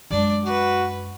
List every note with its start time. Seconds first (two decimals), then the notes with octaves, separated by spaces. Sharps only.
0.11 F#2 G#3 D4 D5
0.45 F#4 B4